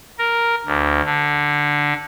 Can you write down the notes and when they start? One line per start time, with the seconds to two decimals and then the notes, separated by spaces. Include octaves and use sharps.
0.19 A#4
0.66 D2
1.05 D3